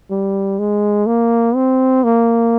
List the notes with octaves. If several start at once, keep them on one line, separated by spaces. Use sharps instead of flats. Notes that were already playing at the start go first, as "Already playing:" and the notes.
G3
G#3
A#3
C4
A#3